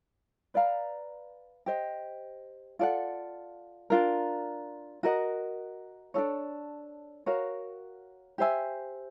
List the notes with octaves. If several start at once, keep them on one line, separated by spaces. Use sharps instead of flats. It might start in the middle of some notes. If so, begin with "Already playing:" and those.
B4 D5 F5 A#5
G4 C5 D#5
F4 A4 D5 F#5
D4 F4 A#4
F#4 A#4 D#5 F#5
D4 F#4 A4 C#5
F#4 A#4 C#5 F5
G4 C5 E5 G#5